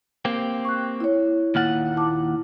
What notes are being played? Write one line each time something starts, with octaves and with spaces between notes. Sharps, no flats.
A#3 C4 G4
C#6 F#6
E4 C#5
D#2 A#2 F#5 F6 A6
E4 A5 D6